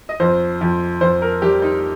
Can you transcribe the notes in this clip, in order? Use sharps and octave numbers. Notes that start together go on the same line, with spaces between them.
D#5
F2 C5
F2
F2 C5
A#4
G3 G4
D#4